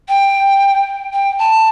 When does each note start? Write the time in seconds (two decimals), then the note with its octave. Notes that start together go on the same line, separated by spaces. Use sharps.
0.09 G5
1.13 G5
1.39 A5